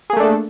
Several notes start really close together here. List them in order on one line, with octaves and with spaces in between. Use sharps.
G#4 A#3 A3 D4 A4